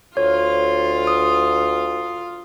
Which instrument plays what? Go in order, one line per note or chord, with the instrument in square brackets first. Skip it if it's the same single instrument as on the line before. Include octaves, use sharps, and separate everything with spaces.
[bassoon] D2 [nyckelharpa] F4 F5 [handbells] C#5
[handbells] D#6